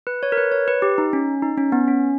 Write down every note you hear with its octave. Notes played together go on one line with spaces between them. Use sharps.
B4
C#5
A#4
B4
C#5
B4
G4
D#4
C#4
D#4
C#4
B3
C#4